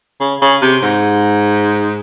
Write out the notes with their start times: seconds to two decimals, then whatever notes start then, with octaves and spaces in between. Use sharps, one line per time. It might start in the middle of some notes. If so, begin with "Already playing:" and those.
0.20 C#3
0.41 C#3
0.62 C3
0.83 G#2